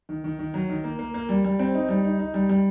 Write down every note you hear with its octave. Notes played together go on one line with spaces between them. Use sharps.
D#3
D#3
D#3
F#3
D#3
A#3
A#3
A#3
G3
G3
C4
D#4
G3
D#4
D#4
G3
G3